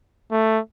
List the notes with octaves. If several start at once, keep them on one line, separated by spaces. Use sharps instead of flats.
A3